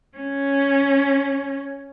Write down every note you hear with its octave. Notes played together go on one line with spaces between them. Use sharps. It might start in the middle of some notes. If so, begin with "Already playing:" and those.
C#4